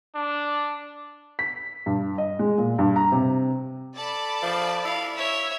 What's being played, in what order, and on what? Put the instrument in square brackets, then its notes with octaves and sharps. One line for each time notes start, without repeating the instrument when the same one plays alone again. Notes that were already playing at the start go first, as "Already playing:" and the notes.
[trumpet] D4
[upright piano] B6
G2
D#5
G#3
A#2
G2
A#5
C3
[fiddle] A4 [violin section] D5 A5 B5
[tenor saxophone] F3
[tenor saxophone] E4 [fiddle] F5
[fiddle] C#5 E5